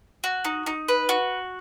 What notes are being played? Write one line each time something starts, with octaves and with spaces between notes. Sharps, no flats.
F#4
D#4
D#4
B4
F#4